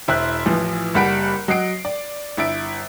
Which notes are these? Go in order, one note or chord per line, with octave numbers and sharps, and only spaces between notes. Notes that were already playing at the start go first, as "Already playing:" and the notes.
E1 E4 C5 C6 F#6
A1 E3 F3
F#1 G3 F#5 B5 D7
F#3 D#5 F#5 C7 D7
D5
G1 E4 A6 D7